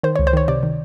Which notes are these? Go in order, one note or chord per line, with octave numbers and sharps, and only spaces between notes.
D#3 C5
C#5
C#2
C5
D#3 C#5
C3 D5
D#3